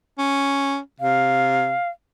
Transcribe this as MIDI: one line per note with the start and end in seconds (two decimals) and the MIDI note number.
0.18 0.79 61
1.00 1.75 48
1.00 1.89 77